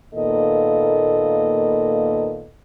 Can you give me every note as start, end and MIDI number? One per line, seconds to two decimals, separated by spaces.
0.14 2.49 46
0.14 2.49 51
0.14 2.49 58
0.14 2.49 59
0.14 2.49 69
0.14 2.49 75